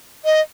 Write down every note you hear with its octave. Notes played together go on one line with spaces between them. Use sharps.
D#5